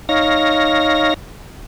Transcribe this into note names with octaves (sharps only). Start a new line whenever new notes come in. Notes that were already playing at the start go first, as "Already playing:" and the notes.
D#4 C#5 F5 A#6